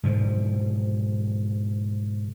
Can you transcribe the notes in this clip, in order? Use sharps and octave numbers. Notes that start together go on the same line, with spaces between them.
G#2 B2 D3 F3